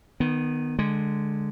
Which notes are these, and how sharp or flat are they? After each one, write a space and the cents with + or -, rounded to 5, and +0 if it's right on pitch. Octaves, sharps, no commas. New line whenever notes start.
D#3 -20 B3 +0
D3 +10 G#3 +0